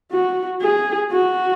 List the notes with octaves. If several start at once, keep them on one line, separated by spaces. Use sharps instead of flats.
F#4
G#4
F#4